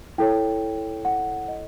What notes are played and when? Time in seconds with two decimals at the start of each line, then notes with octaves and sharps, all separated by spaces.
0.18 E4 A4 C#5 G5
1.05 F#5
1.48 D#5